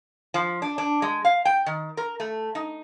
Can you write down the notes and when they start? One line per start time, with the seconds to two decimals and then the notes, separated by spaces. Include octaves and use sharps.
0.34 F3
0.62 D4
0.78 D4
1.02 G#3
1.25 F5
1.45 G5
1.66 D#3
1.97 A#4
2.20 A3
2.55 D#4